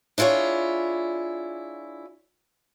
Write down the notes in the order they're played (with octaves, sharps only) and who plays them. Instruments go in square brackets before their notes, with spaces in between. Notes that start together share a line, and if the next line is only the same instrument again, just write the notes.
[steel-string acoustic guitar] D4 E4 F4 G#4 C#5